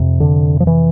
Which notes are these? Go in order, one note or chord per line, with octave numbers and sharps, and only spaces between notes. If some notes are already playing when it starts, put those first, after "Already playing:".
Already playing: F2 C3
D3
F3
E3